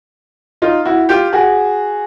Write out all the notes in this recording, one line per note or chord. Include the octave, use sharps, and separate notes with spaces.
D#4 F4
E4 F#4
F4 G4
F#4 G#4